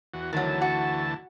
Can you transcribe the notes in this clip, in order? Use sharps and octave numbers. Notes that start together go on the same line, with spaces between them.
E2 F#4
D2 D#3 E3 F#3 A5
F#4